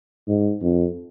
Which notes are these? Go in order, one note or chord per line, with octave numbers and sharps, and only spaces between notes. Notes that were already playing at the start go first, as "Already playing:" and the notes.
G#2
F2